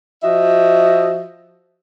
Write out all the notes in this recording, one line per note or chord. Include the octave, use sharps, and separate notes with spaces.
F3 F#4 D#5 E5